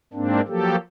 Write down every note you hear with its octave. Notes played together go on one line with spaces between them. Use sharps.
G#2 A#3 C4 D4
F3 F#3 A#3 G4 A4